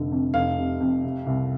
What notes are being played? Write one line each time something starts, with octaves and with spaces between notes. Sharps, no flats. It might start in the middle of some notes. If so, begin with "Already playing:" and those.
Already playing: F1 D3
F2
F1 F5
C3
F2
C3
C2